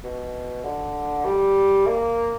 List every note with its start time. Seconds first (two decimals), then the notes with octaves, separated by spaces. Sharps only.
0.04 B2
0.64 D3
1.25 G3
1.86 A#3